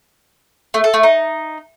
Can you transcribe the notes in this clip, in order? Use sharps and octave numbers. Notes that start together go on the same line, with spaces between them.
A3
A4
A3
D#4